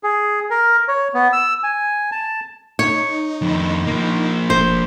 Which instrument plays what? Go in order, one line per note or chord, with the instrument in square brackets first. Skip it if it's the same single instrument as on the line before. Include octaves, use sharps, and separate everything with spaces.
[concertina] G#4
A#4
C#5
B3
E6
G#5
A5
[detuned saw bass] D#4 [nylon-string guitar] C#5
[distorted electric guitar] F2 D#3
F3 A#3
[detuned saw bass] E1 [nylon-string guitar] C5